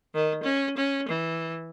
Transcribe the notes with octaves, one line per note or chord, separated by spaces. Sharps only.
D#3
C#4
C#4
E3